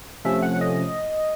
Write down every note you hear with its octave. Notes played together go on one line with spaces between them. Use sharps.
C3 F3 A3 C#4 E5
F#5
D#5